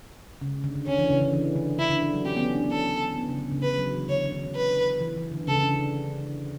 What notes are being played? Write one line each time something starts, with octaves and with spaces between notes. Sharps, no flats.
C#3
D3
D3
D3 C#4
E3
C#3
D3
E3
D3
D3 E4
D3
E3
F#3
C#4 G4
B3
C#4
D4
B3
C#4 A4
B3
C#3
D3
C#3
D3 B4
F#3
E3
D3 C#5
D3
D3
D3
B4
E3
E3
D3
C#3 A4
D3
C#3